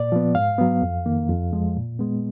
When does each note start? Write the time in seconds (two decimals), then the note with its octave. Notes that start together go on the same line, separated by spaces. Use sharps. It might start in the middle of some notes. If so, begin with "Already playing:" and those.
Already playing: A#2 D5
0.12 F3 B3
0.35 G#2 F5
0.58 F#3 B3
0.82 F2
1.06 D#3 A#3
1.29 F2
1.53 F3 G#3
1.77 A#2
1.99 G#3 B3